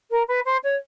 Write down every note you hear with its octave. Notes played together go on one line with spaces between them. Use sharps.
A#4
B4
C5
C#5